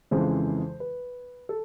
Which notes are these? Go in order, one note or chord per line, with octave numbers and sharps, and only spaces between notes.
F2 C#3 E3 G#3 C5
B4
A4